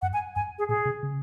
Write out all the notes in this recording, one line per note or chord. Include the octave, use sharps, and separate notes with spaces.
F#2 F#5
G#5
F#2 G#5
G#4
A#2 G#4
C3
C#3